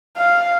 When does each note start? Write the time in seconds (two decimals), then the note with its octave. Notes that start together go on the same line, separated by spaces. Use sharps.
0.18 F5